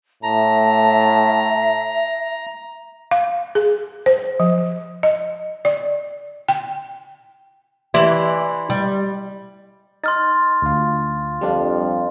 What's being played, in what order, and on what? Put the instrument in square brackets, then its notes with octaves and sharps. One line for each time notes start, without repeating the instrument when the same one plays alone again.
[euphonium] A2 [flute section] E5 [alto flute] A5 [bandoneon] A#5
[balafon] F5
G#4
C5
F3
D#5
D5
G5
[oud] E3 E4 G4 [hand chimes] D5 C6 B6
[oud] G3
[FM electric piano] D#4 [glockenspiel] C6 F6 A6
[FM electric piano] D2 F4
[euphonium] F2 [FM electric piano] G3 D4 F4